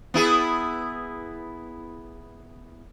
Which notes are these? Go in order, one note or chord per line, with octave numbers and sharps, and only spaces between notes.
B3 E4 G#4